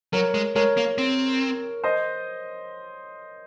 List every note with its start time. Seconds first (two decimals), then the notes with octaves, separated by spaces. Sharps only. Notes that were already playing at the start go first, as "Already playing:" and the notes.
0.13 F#3 A#4 C#5
0.34 G#3
0.56 G#3 A#4 C#5
0.77 A#3
0.98 C4
1.84 C5 D#5